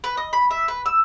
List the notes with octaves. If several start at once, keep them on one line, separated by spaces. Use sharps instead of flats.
B4
D#5
B5
E5
B4
E6